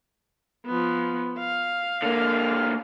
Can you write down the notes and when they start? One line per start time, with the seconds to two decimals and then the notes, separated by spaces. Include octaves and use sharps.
0.66 F3 B3
1.39 F5
2.03 D3 A#3